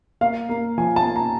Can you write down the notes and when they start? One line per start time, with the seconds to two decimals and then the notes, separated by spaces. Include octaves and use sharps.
0.21 A#3 F5
0.49 A#3
0.78 F3 G#5
0.96 A5
1.06 A#3
1.16 A#5